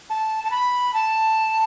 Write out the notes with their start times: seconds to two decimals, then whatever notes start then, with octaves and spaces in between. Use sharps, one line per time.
0.10 A5
0.44 A5
0.51 B5
0.94 A5